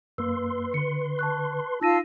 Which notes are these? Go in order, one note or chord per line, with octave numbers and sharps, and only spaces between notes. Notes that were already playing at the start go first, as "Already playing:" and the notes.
F#2 A#3 B4 C6 E6
D3 C#7
A5 C#6 F#6
D#4 F4 A5 E6 A#6 D#7